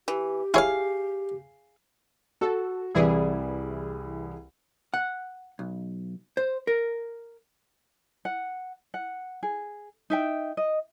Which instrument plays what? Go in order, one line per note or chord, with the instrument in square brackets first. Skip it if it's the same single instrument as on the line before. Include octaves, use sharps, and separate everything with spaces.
[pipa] E3 [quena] G4
[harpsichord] E4 C#5 [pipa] G#4 F5
[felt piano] F#4 [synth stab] A4
[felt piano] C2 G3 D5 [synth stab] E3 E4 G#4
[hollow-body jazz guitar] F#5
B1
C5
A#4
[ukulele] F#5
F#5
G#4
D#4 E5 G5
D#5